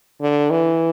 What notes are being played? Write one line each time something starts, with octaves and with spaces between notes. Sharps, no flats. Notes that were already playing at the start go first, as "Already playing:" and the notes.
D3
E3